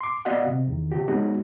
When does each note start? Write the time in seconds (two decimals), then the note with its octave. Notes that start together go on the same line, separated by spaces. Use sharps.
0.01 C6 D6
0.25 B3 F#4 D5 D#5 F5 F#5
0.47 C3
0.68 E2 D#3
0.92 C#3 F#4 G4
1.08 G#3 B3 C#4 D#4 F#4